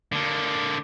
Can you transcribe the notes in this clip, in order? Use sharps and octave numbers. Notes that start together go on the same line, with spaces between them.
D3 A#3